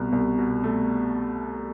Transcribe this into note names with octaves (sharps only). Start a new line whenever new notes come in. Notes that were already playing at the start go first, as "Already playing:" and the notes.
Already playing: C2 B2
C2
B2
A3